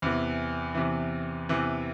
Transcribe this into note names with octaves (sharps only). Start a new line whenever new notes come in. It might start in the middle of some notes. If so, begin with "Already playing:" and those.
E2 C3 E3
E2 C3 E3
E2 C3 E3